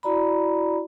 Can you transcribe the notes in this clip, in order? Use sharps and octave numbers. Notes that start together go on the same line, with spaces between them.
E4 F#4 D5 A#5 B5